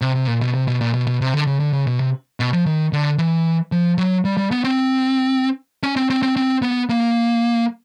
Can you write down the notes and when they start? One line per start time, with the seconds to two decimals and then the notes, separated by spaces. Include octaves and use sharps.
0.01 C3
0.15 C3
0.27 A#2
0.41 B2
0.54 C3
0.68 B2
0.81 A#2
0.94 B2
1.07 B2
1.21 C3
1.34 D3
1.47 C#3
1.60 D3
1.73 C#3
1.87 B2
1.99 C3
2.40 B2
2.53 F3
2.66 D#3
2.93 D3
3.18 E3
3.72 F3
3.98 F#3
4.25 G3
4.37 G3
4.51 B3
4.64 C4
5.83 C#4
5.96 C4
6.10 C4
6.23 C4
6.36 C4
6.62 B3
6.89 A#3